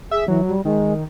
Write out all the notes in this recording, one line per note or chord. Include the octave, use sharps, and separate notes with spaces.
G#4 E5
E3 F#3
G3
D#3 G#3